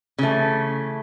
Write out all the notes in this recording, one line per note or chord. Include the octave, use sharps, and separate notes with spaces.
C#3 E3 A3